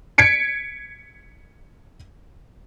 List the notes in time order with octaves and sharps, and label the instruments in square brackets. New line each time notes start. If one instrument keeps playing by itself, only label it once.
[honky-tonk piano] G#6 B6 C#7 D7